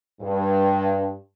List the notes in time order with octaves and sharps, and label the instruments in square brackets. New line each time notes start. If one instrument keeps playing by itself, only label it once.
[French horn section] G2